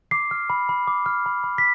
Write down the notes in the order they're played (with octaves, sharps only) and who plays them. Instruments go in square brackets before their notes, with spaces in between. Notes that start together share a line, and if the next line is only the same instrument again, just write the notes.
[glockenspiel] D6 C7
F6
B5
B5
D6
F6
B5
B5
B6